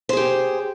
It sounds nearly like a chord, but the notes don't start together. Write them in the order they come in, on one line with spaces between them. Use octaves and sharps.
C5 G#4 G4